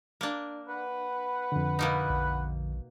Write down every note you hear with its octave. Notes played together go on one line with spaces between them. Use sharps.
A#3 D4
B4 F#5
F2 D3
B2 A#3 D#4
A#1